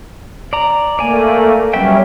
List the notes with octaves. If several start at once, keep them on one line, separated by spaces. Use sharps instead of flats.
D5 A#5
A3 A#3 D5 G#5
F#3 G3 B3 C#4 E5 G5